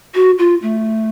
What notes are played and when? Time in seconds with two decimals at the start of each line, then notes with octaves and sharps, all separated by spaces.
0.15 F#4
0.39 F4
0.62 A3